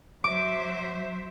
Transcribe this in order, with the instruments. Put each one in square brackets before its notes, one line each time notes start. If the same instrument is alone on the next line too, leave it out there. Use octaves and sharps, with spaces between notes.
[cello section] F#3 C5 E5 [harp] D6